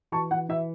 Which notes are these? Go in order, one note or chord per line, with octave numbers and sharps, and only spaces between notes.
E3 A5 C#6
E3 F#5
E3 E5